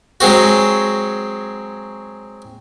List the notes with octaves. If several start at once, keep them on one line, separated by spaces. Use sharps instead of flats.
F#3 G#3 C4 F#4